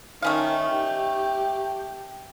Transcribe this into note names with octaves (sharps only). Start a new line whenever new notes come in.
D#3 A3 C#4 F5
G4